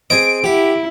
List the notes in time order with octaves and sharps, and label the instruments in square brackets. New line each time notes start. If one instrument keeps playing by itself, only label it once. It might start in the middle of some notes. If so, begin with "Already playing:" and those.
[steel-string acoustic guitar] C4 G#4 [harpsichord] D#5 G#5 [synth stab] D7
[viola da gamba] E4 [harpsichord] G4 [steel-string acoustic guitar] F#5